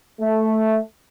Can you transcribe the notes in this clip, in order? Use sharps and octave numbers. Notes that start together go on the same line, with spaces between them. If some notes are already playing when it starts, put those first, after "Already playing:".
A3